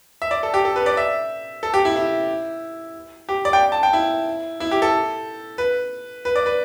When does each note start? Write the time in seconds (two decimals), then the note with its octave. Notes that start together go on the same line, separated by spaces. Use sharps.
0.22 E5
0.31 D5
0.43 A4
0.54 G4
0.65 A4
0.76 B4
0.86 D5
0.97 E5
1.63 A4
1.74 G4
1.85 E4
1.96 E4
3.29 G4
3.45 D5
3.53 G5
3.72 A5
3.83 G5
3.93 E4
4.60 E4
4.71 G4
4.82 A4
5.58 B4
6.25 B4
6.36 D5
6.46 B4